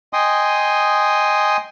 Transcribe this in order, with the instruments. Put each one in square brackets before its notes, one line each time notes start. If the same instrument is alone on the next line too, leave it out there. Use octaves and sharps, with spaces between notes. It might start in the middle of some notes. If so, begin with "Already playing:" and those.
[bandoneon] D#5 G5 G#5 C6 D#6